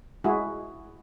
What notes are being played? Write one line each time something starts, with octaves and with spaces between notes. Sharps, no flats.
G#3 E4 F#4 G#4